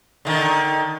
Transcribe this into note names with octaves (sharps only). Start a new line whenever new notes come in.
D3 D#3